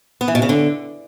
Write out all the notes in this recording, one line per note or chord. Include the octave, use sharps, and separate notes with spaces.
B3
E3
B2
C#3
D3